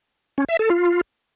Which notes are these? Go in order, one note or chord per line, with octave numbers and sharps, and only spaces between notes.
C#4
E5
A4
F4